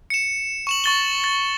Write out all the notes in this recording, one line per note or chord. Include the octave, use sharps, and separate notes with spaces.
C#7 E7
C#6 E7 F#7
C#6 A6 G7
A6